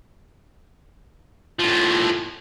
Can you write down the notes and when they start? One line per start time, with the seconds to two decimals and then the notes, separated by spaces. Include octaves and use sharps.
1.59 A2 F3